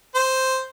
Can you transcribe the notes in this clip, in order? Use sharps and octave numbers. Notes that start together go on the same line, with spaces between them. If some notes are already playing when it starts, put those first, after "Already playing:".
C5